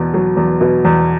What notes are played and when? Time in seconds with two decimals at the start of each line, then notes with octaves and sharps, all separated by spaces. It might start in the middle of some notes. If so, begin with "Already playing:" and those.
Already playing: E2 B2
0.14 F#3
0.37 E2
0.61 B2
0.85 E2